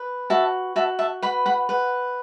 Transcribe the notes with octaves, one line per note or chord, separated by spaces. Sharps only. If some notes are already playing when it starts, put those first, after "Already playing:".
Already playing: B4
F#4 E5 A5
F#4 E5 A5
E5 A5
B4 F#5 B5
F#5 B5
B4 F#5